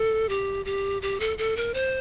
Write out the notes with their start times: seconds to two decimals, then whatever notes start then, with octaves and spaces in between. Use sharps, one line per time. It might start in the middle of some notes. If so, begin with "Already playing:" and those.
Already playing: A4
0.29 G4
0.65 G4
1.02 G4
1.20 A4
1.38 A4
1.57 A#4
1.74 C5